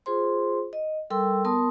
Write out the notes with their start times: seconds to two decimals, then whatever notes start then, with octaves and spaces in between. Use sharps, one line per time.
0.06 F4 G#4 C5 C6
0.73 D#5
1.10 G3 A4 A#4 G5 C6 E6
1.45 B3 A#4 A5 C6 D#6